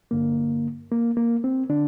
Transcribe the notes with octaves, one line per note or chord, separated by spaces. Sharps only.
G2 D3 A#3
A#3
A#3
C4
D3 D4